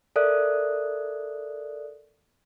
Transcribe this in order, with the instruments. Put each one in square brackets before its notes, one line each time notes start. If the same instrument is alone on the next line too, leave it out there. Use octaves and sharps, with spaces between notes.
[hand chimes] A4 A#4 D5 E5 D#6 F#6